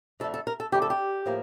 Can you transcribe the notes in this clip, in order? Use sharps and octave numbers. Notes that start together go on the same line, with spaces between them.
F2 D3 A3 A4
A4
A#4
A4
F2 D3 A3 G4
A4
G4
A2 F3 A#3